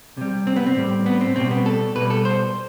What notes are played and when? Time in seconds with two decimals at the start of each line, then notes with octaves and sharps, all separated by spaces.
0.17 C3 G3
0.47 C4
0.56 B3
0.67 C4
0.76 A2 G3
1.06 B3
1.21 C4
1.36 B2 G3 C4
1.51 B3
1.66 A4
1.96 B2 G3 B4
2.10 A4
2.25 C5